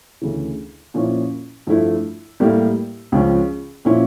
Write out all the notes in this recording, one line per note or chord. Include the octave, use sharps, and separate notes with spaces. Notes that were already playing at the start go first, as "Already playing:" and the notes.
D2 C#3 E3
A#2 F3 C#4 E4
G2 F3 A3 E4
A2 G3 A#3 E4 G4
C#2 C#3 F3 C#4
A#2 F3 C#4 E4